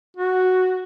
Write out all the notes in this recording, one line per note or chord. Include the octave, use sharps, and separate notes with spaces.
F#4